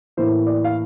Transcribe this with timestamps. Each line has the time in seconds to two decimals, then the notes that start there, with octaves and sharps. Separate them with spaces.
0.17 A2 E3 A#3 C5
0.47 D5
0.64 F5